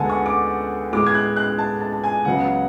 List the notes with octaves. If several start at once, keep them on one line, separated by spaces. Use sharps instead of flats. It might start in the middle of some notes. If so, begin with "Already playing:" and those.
Already playing: D2 D3 G#3 B3 F#5 G#5 A5
C#6
D6
A2 G#3 B3 D6
G#6
F#6
F#6
A5
A5
A5
G#5
C#2 C#3 F#3 B3 F#5